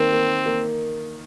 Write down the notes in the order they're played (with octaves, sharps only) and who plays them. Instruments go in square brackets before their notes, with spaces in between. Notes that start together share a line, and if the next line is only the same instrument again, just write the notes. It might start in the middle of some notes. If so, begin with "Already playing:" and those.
Already playing: [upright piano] D#3 A#3 [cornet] C4
[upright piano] A#3
A#3